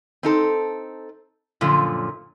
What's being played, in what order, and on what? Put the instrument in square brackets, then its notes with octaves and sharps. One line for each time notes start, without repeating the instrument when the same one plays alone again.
[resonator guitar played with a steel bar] C4 D#4 A4
F#2 A#2 D3 F3